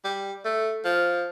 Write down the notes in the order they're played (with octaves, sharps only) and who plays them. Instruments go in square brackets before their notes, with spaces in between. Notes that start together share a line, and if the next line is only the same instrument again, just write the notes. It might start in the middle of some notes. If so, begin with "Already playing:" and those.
[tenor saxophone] G3
A3
F3